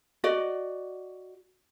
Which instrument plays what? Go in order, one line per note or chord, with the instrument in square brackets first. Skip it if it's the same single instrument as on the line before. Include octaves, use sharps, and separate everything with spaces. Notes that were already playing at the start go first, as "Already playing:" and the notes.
[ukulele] F#4 D5 D#5